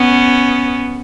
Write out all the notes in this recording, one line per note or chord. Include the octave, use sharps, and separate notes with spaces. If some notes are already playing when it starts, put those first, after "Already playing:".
Already playing: B3 C#4